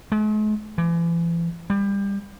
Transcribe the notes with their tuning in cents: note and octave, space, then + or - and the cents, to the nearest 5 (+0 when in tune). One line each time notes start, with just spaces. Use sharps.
G#3 +45
E3 +40
G3 +25